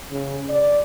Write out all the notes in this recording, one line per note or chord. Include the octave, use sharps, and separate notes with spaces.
C#3
D5